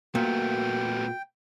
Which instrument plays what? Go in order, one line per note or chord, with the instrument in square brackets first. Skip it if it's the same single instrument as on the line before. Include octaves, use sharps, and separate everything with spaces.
[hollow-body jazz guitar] A#2 [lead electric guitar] A3 B3 [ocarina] F#4 [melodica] G5